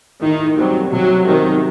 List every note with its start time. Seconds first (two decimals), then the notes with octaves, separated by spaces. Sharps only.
0.21 A2 D#3
0.57 F#3 G3 C4 F#4
0.93 C3 F#3
1.27 D#3 F#3 C4 D#4 F#4